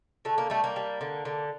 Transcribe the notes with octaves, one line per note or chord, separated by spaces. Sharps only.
D3 A3
A#3
G3 A3
A#3
G3
D3
D3